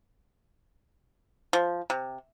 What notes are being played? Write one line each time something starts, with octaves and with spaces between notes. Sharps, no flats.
F3
C3